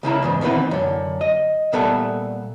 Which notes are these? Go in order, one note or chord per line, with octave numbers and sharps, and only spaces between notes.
C#2 C#3 E4 A#5
E2 G#2 B2
D2 B2 D#3 E3 B3 C4
F#2 D3
D#5
A#2 G3 B3 A4 E5 A5